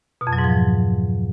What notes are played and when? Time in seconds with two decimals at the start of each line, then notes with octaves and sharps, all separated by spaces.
0.21 B2
0.27 F2
0.33 F#3
0.38 G#2
0.44 F3